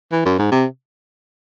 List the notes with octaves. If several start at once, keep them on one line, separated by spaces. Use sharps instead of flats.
E3
F#2
G#2
C3